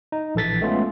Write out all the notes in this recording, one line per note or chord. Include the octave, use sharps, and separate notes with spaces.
D#4
A#1 E3 A4 A6 B6
G#3 A3 B3 C#4 F4